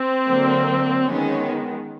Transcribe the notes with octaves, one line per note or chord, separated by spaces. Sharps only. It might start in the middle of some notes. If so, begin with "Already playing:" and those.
Already playing: C4
D3 F#3 A#3
D#3 G#3 B3 C#4